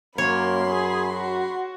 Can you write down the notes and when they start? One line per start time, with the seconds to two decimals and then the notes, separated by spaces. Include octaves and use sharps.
0.18 F#2 A#3 C#5 B5 C6
0.70 G#4
1.14 F#4